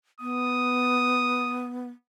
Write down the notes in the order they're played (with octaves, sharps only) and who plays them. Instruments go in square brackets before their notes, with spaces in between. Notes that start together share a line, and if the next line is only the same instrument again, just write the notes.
[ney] B3 [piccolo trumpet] D#6